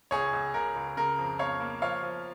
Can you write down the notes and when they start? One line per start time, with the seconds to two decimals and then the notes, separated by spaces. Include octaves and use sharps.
0.11 C#2 G#4 C#5
0.33 C#2
0.54 C#2 A#4
0.76 C#2
0.97 C#3 A#4
1.19 F2
1.39 F2 C#5 F5
1.60 A#3
1.82 F3 C#5 F5
2.03 F3